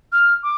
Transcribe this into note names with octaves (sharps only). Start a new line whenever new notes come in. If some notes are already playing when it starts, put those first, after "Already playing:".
F6
D6